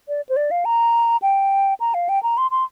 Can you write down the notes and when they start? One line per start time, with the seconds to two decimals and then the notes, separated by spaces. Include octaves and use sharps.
0.08 D5
0.29 C5
0.36 D5
0.51 F5
0.65 A#5
1.22 G5
1.80 A#5
1.94 F5
2.09 G5
2.23 A#5
2.37 C6
2.51 C6